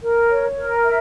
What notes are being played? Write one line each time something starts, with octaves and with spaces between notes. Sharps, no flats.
A#4
C#5
A#4
E5